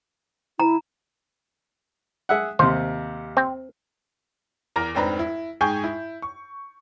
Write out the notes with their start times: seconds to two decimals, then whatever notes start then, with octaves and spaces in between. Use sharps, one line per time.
0.60 E4 A#5
2.29 G#4 E5 F#5
2.59 D#2 C3 C5
3.37 C4
4.76 E2 A#4 A#5 A#6
4.95 F1 G#2 C4 D4 B4 A#5
5.19 E4
5.61 G#2 G#4 G5 G#5 C#6 G6
5.84 E4
6.22 C#6